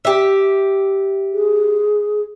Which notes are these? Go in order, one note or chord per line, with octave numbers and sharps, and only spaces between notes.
G4 E5
G#4